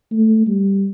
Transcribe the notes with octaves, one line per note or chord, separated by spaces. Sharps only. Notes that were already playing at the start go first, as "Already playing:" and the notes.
A3
G3